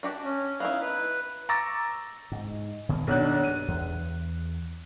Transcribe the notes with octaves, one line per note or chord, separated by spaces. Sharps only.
D4 F#4 G4
C#4
B3 D#4 E4 F5
B4
A#5 C#6 D6 E6 A6 A#6
G#2
B2 D#3 A#3
B1 D4 F#6
G2 D#7
E2